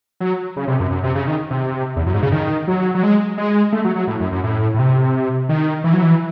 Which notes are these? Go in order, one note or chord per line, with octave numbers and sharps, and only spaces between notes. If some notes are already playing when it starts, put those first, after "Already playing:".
F#3
C#3
C3
F#2
F#2
C3
C#3
D#3
C3
E2
F#2
G#2
C#3
D#3
F#3
F#3
G#3
G#3
A3
F#3
F#3
A2
F#2
F#2
A2
A2
C3
D#3
E3
F#3
E3